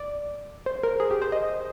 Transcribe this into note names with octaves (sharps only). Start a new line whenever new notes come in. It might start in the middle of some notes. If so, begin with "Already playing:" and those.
Already playing: D5
C5
A#4
G#4
G4
C5
D#5